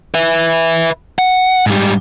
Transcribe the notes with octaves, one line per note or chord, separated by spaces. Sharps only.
B4 E5
F#5
G#2 G3